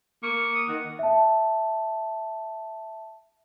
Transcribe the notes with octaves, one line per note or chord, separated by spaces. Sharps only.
A#3 C#6
D#6
D#3 F#5
E5 A5